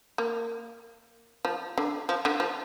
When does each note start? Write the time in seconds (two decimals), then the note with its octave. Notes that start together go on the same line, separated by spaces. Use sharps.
0.18 A#3
1.45 F3
1.78 D3
2.09 F3
2.25 D3
2.40 F3